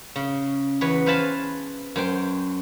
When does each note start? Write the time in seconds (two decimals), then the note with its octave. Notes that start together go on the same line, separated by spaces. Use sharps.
0.16 C#3
0.81 E2 B4 C#5
1.06 B4 C5 F5 G#5 A5 B5
1.96 F#2 C5 G5